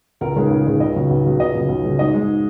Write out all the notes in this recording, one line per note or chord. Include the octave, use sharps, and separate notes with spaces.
C#2 A#4
C#3 G#3
C#2
C#3 G#3
C#2 D#5
C#3 F#3
C#2
C#3 F#3
C#2 D#5
C#3 F#3
C#2
C#3 F#3
G#2 D#5
G#3